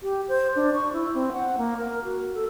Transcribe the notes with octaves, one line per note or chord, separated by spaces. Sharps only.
G4
C5
D4
C#6
E4
C4
F#5
A#3
A#4
F#4
A4